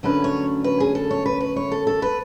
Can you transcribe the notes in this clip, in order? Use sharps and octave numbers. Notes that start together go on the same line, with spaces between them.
F#2 D3 F#3 A3 C#4 B4
C#5
B4
G#4
A4
C#5
B4
B4
C#5
A4
A4
B4